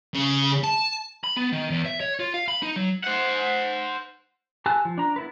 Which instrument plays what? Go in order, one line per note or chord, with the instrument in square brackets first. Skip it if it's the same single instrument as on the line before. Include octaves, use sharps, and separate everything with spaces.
[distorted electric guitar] C#3
A5
[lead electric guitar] B5
B3
D#3
E2
E5
C#5
F4
F5
B5
D#4
F#3
[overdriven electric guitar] C5 F#5
[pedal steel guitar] G4 G#5 A5 E6 F#6
F3
D4 A#5
B3 E4 B4